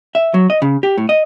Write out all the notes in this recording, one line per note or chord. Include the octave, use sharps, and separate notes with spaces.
E5
F#3
D#5
C#3
G4
A2
D#5